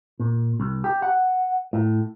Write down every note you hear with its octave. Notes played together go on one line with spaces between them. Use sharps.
A#2
C2
G4
F#5
A2